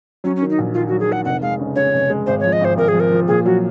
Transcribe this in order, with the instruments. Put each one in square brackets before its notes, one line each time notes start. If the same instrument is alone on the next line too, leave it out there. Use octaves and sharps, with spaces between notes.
[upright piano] F#3 [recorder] C#4
[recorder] C#4
[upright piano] D#3
[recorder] D#4
[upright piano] A#1
[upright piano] D#3 [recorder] F4
[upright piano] F#3 [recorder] F#4
[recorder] G#4
[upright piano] D#3 [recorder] F#5
[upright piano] F1 [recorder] F#5
[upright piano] G#3 [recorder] F5
[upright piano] C#3
[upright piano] C#3 [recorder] C#5
[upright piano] F1
G#3
[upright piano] G#1 [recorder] C5
[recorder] C#5
[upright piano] F3
[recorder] D#5
[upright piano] G#1 [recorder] C5
[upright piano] G#1 [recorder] A#4
[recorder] G#4
[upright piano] F3
[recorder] A#4
[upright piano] F3
[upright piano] A#2 [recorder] G#4
[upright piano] F#3 [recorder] F#4